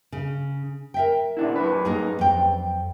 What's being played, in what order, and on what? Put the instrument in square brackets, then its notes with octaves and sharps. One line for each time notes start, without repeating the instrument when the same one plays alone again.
[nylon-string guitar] C#3
A#4 E5 G5
[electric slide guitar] A#2 D4 E4
F#2 B4
[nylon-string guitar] A#3 D#4 G#4
F2 G5